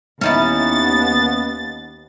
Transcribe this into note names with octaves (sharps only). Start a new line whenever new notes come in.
D#2 B3 C#4 D#4 E4 A6